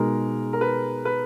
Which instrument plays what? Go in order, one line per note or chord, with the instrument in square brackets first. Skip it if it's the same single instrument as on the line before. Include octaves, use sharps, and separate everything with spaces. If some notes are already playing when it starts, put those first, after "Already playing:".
Already playing: [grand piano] B2 G#3 D#4 G#4 [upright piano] A#4
[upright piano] A#4
B4
B4